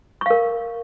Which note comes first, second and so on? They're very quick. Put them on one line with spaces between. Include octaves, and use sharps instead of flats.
C#6 F5 A#4